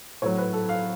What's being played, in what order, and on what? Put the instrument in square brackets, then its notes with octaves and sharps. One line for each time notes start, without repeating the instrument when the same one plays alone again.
[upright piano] A2 F#3 C#5
B4
A4
F5